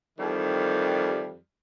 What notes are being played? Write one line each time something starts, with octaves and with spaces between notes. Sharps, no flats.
F2 D#3 E3 G3